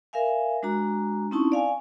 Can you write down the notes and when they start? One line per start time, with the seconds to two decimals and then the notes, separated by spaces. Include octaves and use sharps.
0.13 A#4 E5 F5 G#5
0.63 G#3 D4 F#4 A#5
1.31 C4 C#4 D#4 E4 A5 C#6
1.52 D5 F5 G#5